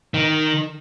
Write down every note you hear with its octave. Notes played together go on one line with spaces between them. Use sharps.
D#3